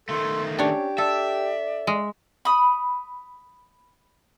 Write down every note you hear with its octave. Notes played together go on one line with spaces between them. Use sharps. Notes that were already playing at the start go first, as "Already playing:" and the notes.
D#3 A3 A4 C6
C#4 D4 G4 C#5
A4 D5 E5
G#3
B5 D#6